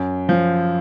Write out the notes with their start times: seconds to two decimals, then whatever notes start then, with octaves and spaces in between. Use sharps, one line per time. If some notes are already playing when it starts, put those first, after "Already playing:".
Already playing: F#2
0.29 F3